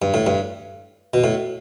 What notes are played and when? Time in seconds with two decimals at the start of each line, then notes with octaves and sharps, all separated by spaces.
0.02 G2
0.14 A2
0.26 G2
1.14 B2
1.24 A2